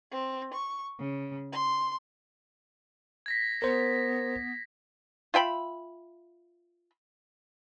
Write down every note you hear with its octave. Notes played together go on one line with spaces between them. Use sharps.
C4
C#6
C#3
C6
G#6 A#6 B6
B3 A#4 C5
F4 E5 G5 B5